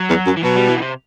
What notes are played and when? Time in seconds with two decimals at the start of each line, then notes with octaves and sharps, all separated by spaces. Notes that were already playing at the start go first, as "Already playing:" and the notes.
Already playing: F#3
0.10 E2
0.26 F#2
0.36 E3
0.43 B2 F#3
0.56 G3
0.68 E3
0.76 B2
0.81 C3